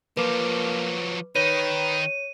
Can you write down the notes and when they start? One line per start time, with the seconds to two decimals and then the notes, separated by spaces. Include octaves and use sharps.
0.17 F3 F#3 A#3 B4 D6
1.36 D#3 D#4 B4 C#5 D#7